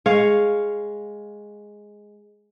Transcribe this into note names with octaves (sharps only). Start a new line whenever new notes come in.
G#3 C#5 F5